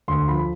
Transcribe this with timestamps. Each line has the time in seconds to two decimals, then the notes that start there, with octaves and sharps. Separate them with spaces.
0.08 D2 C6
0.28 F3 B5